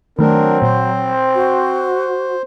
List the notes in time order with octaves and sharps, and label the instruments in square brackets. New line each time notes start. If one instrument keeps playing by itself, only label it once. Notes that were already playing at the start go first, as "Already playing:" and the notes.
[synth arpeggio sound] D#3 A3 [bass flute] F#3 [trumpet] C4 [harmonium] D4 A#4
[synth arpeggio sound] A#2 [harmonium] C5
[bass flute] F#4